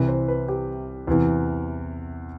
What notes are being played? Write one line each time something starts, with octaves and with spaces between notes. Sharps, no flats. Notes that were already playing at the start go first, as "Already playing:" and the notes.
Already playing: C2 C3 E3 B4
C5
B4
G4
E2 C3 E3